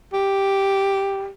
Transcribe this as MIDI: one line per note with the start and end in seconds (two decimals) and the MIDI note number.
0.13 1.28 67